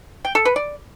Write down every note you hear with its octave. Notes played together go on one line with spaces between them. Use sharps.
G5
A4
B4
D5